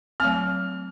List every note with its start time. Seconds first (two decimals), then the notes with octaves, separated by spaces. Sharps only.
0.20 F#3 A3 C4 F6